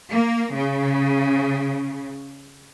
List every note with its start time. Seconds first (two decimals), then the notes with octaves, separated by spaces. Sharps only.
0.12 A#3
0.55 C#3